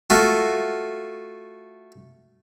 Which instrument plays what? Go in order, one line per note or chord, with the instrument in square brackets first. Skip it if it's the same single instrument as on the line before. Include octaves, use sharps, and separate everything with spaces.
[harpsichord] A3 F4 F#4